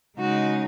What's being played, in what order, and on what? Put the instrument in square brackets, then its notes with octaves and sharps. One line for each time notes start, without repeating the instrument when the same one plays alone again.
[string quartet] C#3 G#3 D#4 F#4